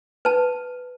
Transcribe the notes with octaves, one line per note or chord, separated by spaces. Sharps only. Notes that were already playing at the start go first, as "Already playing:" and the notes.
B4 A5